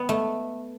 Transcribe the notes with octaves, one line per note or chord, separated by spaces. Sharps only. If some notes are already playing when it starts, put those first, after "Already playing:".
Already playing: B3
A3